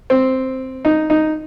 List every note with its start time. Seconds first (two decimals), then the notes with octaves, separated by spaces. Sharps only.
0.10 C4
0.85 D#4
1.10 D#4